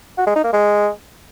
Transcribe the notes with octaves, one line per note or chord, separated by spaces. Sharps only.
F#4
G#3
D#4
A#3
G#3